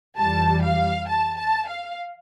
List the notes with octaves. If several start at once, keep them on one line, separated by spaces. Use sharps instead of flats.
F2 E3 G3 A5
F5
A5
A5
F5